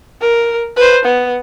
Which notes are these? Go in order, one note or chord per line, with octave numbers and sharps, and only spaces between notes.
A#4
B4 C5
B3